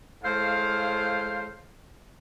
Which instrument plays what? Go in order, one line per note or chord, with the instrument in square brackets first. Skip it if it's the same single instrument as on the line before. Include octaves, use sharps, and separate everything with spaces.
[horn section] A2 G#3 C5 F5